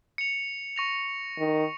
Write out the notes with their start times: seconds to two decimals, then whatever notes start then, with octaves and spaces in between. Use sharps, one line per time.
0.18 C#7 F7
0.76 C#6 A#6 F7
1.38 D#3